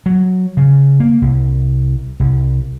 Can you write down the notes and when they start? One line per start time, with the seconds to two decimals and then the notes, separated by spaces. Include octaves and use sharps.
0.06 F#3
0.57 C#3
1.00 A#3
1.22 C2
2.20 C2